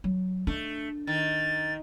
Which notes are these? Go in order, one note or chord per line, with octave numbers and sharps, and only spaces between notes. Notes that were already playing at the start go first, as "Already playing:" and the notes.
F#3
A3 D4
D#3 A6